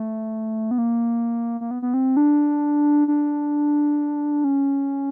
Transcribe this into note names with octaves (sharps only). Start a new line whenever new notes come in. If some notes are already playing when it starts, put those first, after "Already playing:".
Already playing: A3
B3
A#3
A#3
B3
B3
C4
D4
D4
C#4